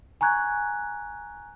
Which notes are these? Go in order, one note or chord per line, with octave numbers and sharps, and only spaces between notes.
G#5 A#5 C#6 F#6 G#6